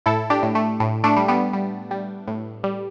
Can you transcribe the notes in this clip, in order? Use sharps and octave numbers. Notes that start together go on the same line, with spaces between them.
A2 E4 A4
D4 G4
A2
A3
A2
A3 D4
G3
G3 B3
G3
G3
A2
G3